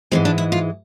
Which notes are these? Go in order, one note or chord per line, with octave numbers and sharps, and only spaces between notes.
G#2 E3 G#3 C4
D4
E4
F4